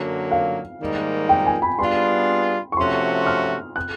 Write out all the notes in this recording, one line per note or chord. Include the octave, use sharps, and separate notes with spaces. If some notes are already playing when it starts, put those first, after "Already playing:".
Already playing: F#2 D3 F#3 A#3
F5
G#2 D#3 G3 A#3 D#4
G5
G#5
B5
G3 B3 D4 F4 G#4 C6
C#6
C3 F3 A3 C#4 F#4 C6
F6
F#6